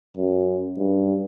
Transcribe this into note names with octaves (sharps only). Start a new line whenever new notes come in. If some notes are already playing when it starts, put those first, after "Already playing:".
F#2
G2